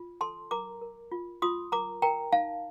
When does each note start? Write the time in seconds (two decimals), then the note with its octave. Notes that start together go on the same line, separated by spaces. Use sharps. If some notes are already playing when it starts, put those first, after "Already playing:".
Already playing: F4
0.21 A4 A5 C6
0.51 A#4 A#5 D6
0.82 A#4
1.12 F4
1.42 F4 C6 D#6
1.72 A#4 A#5 D6
2.02 A#4 G5 A#5
2.32 D#4 F5 A5